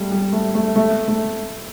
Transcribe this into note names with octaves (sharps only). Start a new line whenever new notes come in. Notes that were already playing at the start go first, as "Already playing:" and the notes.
Already playing: G3 A3
G3
A3
A3
A3
A3